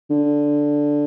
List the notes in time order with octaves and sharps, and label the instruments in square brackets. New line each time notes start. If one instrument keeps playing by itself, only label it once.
[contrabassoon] D3